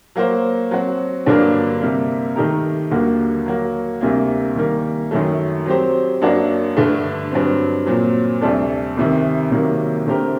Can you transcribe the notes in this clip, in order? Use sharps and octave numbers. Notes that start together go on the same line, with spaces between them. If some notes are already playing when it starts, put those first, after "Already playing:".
F#3 A#3 F#4 C5
F#3 C4 F#4
G2 D3 F#3 A#3 D4
C3 G3 A#3
D#3 A3 D#4 G4 A#4
D#2 D3 G3 A#3 F#4
F#3 A#3 F#4
D2 C3 G3 A#3
D#3 G3 A#3
F#2 D#3 F#3 A3
F#3 C4 G4 C5
F#2 F#3 A#3 D4 F#4
G2 D3 A3
G2 F#3 C4
A#2 F#3 C4
D2 C3 G3 D4 A4
C2 C3 D#3
C3 D#3 F#3 A#3
D3 A3 C4 G4 A#4